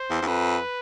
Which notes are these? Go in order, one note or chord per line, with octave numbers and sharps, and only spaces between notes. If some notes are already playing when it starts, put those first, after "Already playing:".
Already playing: C5
E2
E2
F2 B4